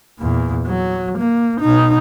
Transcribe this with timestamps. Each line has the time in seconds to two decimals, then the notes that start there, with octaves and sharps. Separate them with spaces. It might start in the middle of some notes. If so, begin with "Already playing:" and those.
0.19 E2 A#2
0.67 F#3
1.18 A#3
1.61 B2 D#4